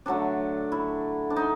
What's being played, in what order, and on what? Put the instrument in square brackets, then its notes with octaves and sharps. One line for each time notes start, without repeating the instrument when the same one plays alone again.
[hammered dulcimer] D3 F#3 A3 D4
E4
D4
D#4